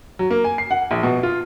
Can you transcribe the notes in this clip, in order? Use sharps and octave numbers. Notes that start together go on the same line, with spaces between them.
F#3
A#3
G#5
C7
F#5
A#1
B2
F4